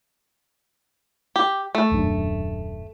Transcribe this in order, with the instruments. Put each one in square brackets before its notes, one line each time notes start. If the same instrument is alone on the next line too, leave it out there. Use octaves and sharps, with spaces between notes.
[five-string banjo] G4
A3
[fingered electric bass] D#1 F#2 D4